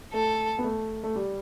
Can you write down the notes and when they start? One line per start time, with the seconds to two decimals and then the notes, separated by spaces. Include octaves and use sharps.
0.13 A3 A4
0.59 B3
0.64 A3
1.04 A3
1.16 G3